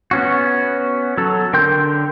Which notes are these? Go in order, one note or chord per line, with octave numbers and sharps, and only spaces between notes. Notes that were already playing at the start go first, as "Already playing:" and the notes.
B3 C#4 F#4
F#3 A4
D3 A#4 G5 C6 G6